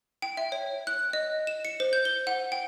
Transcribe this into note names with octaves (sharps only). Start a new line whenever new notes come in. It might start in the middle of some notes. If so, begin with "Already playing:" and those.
G5
E5
C#5
F#6
D#5
E7
C#7
C5
G6
G7
F#5
G5